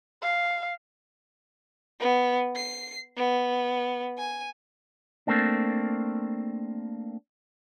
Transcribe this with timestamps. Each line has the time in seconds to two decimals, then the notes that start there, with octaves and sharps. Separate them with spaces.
0.22 F5
2.00 B3
2.56 C7
3.17 B3
4.18 G#5
5.27 A3 A#3 C4 D4